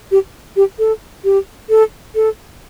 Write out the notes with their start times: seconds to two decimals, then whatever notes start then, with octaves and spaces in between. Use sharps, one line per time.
0.11 G4
0.56 G4
0.79 A4
1.24 G4
1.69 A4
2.15 A4